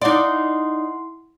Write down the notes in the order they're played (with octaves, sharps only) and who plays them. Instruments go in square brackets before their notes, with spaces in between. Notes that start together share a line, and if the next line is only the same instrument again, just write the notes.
[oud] D#4 D5 [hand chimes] E4 F#5 C6